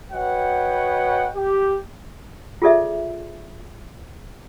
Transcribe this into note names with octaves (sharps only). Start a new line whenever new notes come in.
F#4 B4 C#5 D#5 F#5 G5
G4
F4 G#4 A4 D5 E5